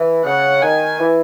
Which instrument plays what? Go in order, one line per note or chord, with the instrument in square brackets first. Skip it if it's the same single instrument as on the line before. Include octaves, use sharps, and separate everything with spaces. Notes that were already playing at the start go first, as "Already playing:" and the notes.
Already playing: [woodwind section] E3
[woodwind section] C#3 [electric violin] F#5
[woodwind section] D#3 [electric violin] G#5
[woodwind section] E3